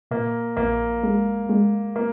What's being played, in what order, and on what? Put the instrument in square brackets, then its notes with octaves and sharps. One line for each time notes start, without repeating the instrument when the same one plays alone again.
[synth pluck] A#2 [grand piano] A#3
[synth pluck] A#1 [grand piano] A#3
[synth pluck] G#3
G#3
[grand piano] A#3